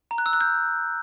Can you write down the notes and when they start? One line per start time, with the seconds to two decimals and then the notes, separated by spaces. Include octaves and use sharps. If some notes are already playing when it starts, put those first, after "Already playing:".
0.11 A#5
0.18 F#6
0.26 E6
0.33 F#6
0.41 G6